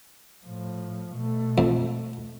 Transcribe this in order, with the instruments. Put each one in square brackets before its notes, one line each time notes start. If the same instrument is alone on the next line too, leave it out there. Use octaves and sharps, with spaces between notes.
[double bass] A2 F3
B2 A3
[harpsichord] F2